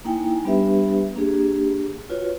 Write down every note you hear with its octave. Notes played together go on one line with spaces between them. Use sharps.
A#3 D#4 E4 G5 G#5
G3 B3 D4 G4 B4 E5
A#3 D4 G4 G#4
F4 F#4 B4 C#5